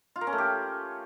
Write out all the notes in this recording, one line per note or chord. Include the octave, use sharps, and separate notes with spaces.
F4
A#4
C#4
A3
G4